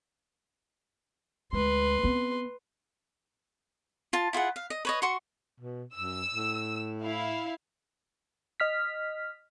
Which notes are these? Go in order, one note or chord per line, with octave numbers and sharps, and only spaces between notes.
D2 G#3 B4 C6
B3 C4
F4 A5
E4 F4 G#4 F#5
F5
D#5
B4 C#5 D#5
F#4 C6 C#6
B2
F#2 E6
A2
E4 F5
D#5 F6 B6